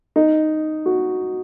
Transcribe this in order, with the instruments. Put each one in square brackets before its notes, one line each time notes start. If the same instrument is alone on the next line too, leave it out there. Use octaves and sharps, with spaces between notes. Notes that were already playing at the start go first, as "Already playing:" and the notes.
[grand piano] D#4
F#4